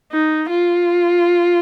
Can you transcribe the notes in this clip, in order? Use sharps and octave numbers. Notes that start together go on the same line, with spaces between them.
D#4
F4